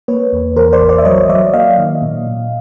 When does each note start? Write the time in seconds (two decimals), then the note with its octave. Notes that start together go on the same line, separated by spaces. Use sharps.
0.08 A#3 B4 C#5
0.33 E2
0.56 E3 A#4 C5
0.73 C5 D5
0.81 A1
0.89 C5 D5
0.98 E5
1.05 F#3 C#5 D#5
1.29 F#3 D5 E5
1.53 A#3 D#5 F5
1.78 D#3
2.02 A#2
2.27 A#2